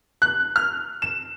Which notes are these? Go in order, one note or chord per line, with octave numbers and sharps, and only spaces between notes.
F#6
F6
E7